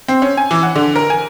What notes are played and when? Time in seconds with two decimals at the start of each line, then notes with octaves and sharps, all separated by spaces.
0.08 C4
0.22 C#4
0.37 G#5
0.51 E3
0.63 F#5
0.76 D3
0.96 A#4
1.10 G#5